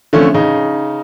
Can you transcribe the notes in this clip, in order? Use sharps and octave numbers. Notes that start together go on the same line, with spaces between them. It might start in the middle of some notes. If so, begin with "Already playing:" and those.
D3 F3 A3 C4 C#4
C#3 D#4